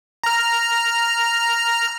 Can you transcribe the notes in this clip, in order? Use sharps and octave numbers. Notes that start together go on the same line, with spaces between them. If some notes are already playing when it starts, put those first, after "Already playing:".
A#5 F6